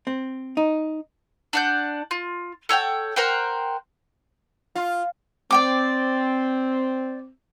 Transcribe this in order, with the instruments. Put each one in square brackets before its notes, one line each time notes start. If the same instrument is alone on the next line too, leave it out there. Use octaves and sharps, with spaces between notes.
[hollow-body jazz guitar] C4
D#4
[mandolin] D4 F#5 G6
F4
A4 C#5 F#5 G5
A#4 C5 F#5 G5
[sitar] F4
[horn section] C4 [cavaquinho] D5 G5 D6